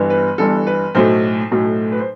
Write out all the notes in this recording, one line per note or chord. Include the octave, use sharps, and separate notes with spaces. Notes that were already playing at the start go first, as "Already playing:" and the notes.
Already playing: G1 G2 E3 B3
B4
G1 G2 E3 B3 A4
B4
B1 A2 F#3 A3 C5
B1 A2 F#3 A3
B4
C5